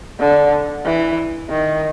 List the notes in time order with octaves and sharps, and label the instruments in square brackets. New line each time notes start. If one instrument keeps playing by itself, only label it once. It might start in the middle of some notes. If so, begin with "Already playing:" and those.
[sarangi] D3
E3
D#3